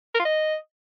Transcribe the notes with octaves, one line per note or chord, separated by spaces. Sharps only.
A#4
F4
D#5